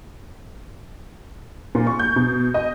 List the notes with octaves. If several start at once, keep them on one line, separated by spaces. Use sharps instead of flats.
A#2
C#6
G6
B2
D#5